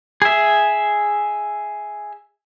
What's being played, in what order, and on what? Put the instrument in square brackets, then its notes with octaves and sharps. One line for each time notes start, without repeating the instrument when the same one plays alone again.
[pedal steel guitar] G#4 E5